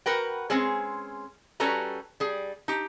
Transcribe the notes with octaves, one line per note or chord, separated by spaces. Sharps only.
F#4 A#4 B4 G5
G#3 C4 C#4 G#4
G3 C#4 F#4 A4 B4 A#5
G3 G#4
D#4 G4